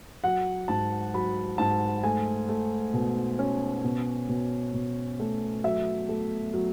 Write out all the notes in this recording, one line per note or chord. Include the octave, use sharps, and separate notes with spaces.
F#3 F#5
G#2 A5
F#3 B5
G#2 A5
A3 G#5
A3
B2
C#4
B2
B2
B2
A3
F#3 E5
A3
F#3